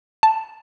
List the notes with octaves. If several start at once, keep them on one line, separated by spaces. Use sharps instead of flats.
A5